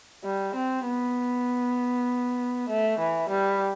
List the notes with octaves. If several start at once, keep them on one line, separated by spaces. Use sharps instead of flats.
G3
C4
B3
A3
E3
G3